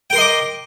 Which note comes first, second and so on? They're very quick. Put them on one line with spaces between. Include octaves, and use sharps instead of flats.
G5 A#4 C6 D#5 D6